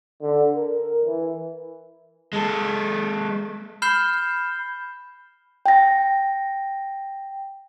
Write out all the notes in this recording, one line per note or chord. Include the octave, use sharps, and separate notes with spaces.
D3
A#4
E3
G#3 A4
B5 F6 G6 C7 E7 G7
G5 A#6